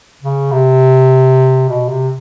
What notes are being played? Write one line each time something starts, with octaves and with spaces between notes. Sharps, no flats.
C#3
C3
B2
C3